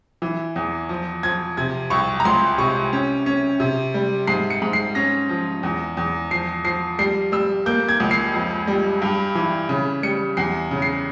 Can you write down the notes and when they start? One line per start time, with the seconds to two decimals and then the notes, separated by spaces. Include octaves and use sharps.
0.22 E3
0.56 E2
0.89 F3
1.23 F3 G#6
1.57 C3 G#6
1.90 C2 C#6
2.20 A#5
2.25 C#2 C6
2.58 C3 C#6
2.93 C#4
3.26 C#4
3.60 C3
3.94 G3
4.27 G#2 C7
4.50 C#7
4.62 G#2
4.73 C7
4.95 C#4 A#6
5.29 F3
5.63 E2
5.97 E2
6.31 F3 C7
6.64 F3 C7
6.99 G3 C7
7.32 G3 E6
7.66 A#3 G6
7.89 G#6
8.00 C#2
8.11 C7
8.34 F2
8.67 G3
9.02 G2
9.35 E3
9.69 C#3
10.03 G3 C#7
10.37 E2 C7
10.71 C#3
10.82 C7